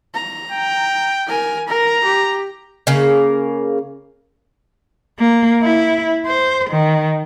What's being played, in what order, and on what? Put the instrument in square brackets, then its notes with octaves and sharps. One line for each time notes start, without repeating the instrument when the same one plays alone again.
[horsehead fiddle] A#5
[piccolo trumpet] G5
[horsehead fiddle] A#4 G#5
[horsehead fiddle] A#4 [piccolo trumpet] A#5
[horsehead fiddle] G4
[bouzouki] C#3 A#3
[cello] A#3
E4
C5
D#3